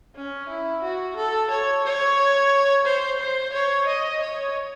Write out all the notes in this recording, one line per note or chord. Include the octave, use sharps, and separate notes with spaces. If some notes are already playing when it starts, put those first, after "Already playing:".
C#4
E4
F#4
A4
C#5
C#5
C5
C5
C#5
D#5
C#5